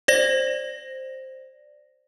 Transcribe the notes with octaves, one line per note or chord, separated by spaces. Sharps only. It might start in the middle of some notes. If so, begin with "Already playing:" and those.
C5 D5 A#6